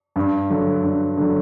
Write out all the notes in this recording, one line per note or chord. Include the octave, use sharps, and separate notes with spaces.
G2
D3 F#3
G2
D3 F#3